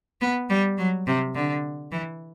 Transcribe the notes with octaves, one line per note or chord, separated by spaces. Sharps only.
B3
G3
F#3
C3
D3
E3